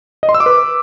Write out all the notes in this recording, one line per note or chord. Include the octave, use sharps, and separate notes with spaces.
D#5
C6
E6
D6
B4